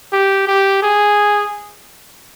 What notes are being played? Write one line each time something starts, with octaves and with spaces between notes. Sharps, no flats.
G4
G4
G#4